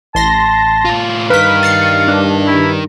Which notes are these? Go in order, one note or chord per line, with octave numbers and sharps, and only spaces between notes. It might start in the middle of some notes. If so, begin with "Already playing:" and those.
A1 A5 C6 A#6
A2 F4
G2 D#4 A#4 B4 F5 B6
A6 C7 C#7
D4
E4